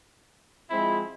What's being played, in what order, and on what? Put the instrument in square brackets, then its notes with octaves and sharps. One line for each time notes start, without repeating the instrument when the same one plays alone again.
[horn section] F3 G#3 C4 E4